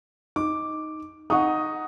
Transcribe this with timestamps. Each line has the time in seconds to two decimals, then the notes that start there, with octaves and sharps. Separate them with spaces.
0.36 D#4 D6
1.30 D#4 F#5 C#6 D#6